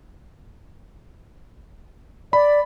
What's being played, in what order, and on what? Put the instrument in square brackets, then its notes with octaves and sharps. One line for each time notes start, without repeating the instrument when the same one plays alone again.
[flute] D5 [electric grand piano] B5